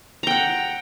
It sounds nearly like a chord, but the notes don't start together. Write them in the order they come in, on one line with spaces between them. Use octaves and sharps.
A#5 G5 F#5